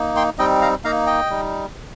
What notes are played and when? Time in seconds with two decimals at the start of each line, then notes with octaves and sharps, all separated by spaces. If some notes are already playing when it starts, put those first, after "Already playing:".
Already playing: A#3 D#4
0.16 G5 C6
0.38 G3 C4 D#4 D#5 G5
0.61 F5 A#5
0.84 A#3 D#4 F5 A#5
1.07 D#5 G5
1.30 G3 D#4